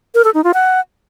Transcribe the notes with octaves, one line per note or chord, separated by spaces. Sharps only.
A#4
A4
D#4
F4
F#5